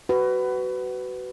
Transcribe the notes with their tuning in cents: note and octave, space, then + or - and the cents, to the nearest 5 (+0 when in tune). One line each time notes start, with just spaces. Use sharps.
F#4 +25 B4 +20